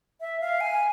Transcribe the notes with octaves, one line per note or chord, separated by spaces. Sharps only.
E5
F5
G#5